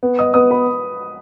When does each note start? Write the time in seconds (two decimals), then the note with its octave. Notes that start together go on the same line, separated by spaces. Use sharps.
0.03 B3
0.19 D#5 D#6
0.34 B3 D#5 D#6
0.51 B4 B5